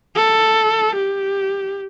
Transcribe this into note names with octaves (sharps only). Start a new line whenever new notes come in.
A4
G4